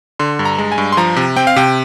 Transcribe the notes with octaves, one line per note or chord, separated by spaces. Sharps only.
D3 C6
G2
A#5
G#3
G#5
G2
C6
F3 A#5
C3
C4 G5
F5
C3 G5